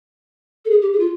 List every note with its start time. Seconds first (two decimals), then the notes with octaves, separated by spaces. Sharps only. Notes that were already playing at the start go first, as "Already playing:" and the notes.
0.65 A4
0.70 G#4
0.81 G4
0.93 G#4
0.99 F4